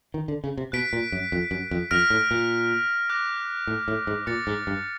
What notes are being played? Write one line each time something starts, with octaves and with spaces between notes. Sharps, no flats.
D#3
D3
C#3
C3
B2 F#6 B6 D7
A#2
F#2
F2
F#2
F2
F2 F6 A#6 D7 F7
A2
A#2
D6 F#6 A#6
A2
A2
G#2
A#2 D6 F#6 A6 C#7
G#2
G2